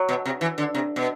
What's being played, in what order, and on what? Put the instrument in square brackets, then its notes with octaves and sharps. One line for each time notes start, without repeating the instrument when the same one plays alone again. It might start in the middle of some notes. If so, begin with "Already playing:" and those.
Already playing: [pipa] F#3
[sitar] B2
C3
E3
D3
C3
B2